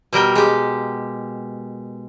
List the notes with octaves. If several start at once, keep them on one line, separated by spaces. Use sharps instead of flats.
B2 G3 A#4 G5
G#3 G4